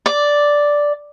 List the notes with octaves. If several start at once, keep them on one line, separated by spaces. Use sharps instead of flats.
D5